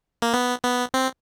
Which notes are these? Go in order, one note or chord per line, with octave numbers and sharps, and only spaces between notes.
A#3
B3
B3
C4